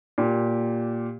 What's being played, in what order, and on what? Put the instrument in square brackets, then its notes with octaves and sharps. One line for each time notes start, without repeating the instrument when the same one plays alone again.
[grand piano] A#2 G4